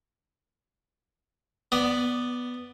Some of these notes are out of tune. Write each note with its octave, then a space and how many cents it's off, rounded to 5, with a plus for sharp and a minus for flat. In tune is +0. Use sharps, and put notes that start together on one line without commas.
B3 +0 D5 +0